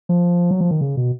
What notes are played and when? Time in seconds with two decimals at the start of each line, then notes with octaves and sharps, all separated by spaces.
0.09 F3
0.51 F#3
0.61 F3
0.71 D#3
0.81 C#3
0.97 B2